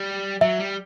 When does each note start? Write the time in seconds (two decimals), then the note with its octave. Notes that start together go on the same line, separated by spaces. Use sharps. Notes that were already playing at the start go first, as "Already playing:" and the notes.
Already playing: G3
0.41 F#3 E5
0.59 G3